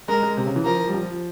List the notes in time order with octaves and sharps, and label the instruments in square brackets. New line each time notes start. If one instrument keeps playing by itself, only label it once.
[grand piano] G#3 [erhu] A#4
[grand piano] G#3
C3
C#3
E3
[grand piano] F3 [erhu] A#4
[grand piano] G3
F3